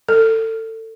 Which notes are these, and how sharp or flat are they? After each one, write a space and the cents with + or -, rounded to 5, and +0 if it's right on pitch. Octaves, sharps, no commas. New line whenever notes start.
A4 +25